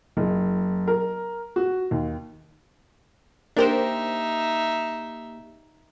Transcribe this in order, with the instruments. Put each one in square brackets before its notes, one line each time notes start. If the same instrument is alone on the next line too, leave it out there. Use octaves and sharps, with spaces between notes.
[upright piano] F#1
A#4
F#4
D#2
[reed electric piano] A#3 G4 [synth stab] D4 A#4 C5 [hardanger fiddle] D#4 E5